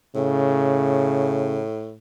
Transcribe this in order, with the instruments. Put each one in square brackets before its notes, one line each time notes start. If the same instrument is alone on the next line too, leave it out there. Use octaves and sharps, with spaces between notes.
[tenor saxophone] A2 [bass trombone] C#3